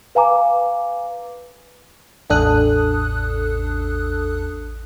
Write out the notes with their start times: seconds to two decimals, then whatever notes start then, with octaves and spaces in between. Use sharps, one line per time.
0.15 B4 F5 G#5 A#5 D6
2.30 A1 E2 D4 A4 D#6 F#6